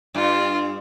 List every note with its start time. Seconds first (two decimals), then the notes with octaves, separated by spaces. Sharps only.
0.15 G2 F4